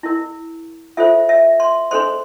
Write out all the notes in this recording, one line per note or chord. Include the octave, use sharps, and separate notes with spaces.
E4 A#4
F4 A4 C5 E5
E5
C6
D4 A4 C5 C6